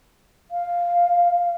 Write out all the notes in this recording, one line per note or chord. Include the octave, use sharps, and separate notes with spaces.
F5